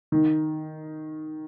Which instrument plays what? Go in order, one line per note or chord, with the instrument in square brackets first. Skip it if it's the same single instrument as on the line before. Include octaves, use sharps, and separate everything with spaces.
[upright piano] D#3